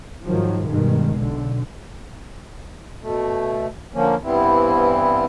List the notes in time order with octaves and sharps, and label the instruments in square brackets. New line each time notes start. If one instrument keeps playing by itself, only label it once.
[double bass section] G#2 D#3 F3 F#3
G2 B2 D#3 G#3
B1 D3
[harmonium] B2 A3
D3 F3 A#3 C#4
G2 E3 G3 B3 C4 E4